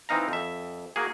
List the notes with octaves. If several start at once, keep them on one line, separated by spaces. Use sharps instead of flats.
E3 C4 D#4 F5 A#5
F2 E5
A#3 F#4 G#4